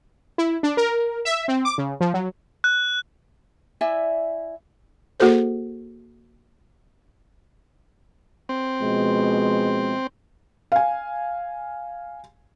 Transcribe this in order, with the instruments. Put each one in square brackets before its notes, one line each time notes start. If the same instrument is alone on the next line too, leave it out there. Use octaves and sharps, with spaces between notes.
[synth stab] E4
D4
A#4
E5
C4
D6
C#3
F3
F#3
[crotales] F#6
[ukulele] E4 D5 E5 G#5
[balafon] A#3 F#4 G#4 A4 C5
[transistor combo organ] C4
[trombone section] B2 F3 G#3
[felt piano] F5 G#5